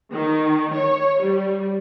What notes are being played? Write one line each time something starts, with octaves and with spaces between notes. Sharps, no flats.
D#3
C#5
G3